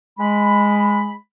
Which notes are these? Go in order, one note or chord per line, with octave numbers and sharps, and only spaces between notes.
G#3 B5